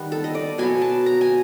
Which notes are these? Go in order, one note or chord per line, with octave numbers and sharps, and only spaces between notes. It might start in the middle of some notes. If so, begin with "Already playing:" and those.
Already playing: D#3 G3 B3
A4
D#5
D5
B2 F#3 B3 G#5
A5
A#5
G#5